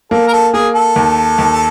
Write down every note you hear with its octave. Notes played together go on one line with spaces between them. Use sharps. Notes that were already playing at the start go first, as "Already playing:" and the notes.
A#3 A4
A#4
A4
A#3 G#4
A4
D#2
D#2